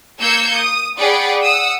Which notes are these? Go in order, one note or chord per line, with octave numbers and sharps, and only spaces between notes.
A#3 E6 G6 G#6 C#7
D#6
G#4 D5 F#5 G5 B5
F#5 D#6 E6